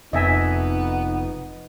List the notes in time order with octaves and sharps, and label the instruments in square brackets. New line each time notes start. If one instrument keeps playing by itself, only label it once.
[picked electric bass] F1 F2 [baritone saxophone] B3 [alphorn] D#4 [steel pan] D#5 E5 G#5